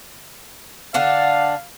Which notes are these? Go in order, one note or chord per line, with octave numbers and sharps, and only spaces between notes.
D3 D4 F5 F#5